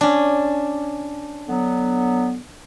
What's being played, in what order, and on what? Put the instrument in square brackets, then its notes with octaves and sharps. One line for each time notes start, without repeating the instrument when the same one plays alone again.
[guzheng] C#4 D4
[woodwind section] D3 F#3 B3